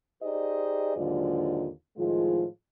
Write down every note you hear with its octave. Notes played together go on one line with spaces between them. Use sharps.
D#4 G4 G#4 C5 D5 D#5
D#2 G#2 D3 F#3 F4 D5
A2 D#3 F3 G#3 F4